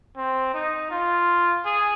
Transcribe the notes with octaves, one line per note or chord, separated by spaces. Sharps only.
C4
D#4
F4
G#4